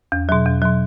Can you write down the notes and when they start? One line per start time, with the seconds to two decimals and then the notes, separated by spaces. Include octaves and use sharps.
0.12 E2
0.29 B2 F#3
0.46 E2
0.62 B2 F#3